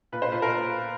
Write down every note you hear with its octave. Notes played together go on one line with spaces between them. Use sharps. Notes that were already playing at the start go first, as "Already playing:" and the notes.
A#2 B4
C5
A#2 B4
A#4